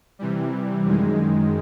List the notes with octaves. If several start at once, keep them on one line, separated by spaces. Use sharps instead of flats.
C3 E3 G3
F#2 D#3 G#3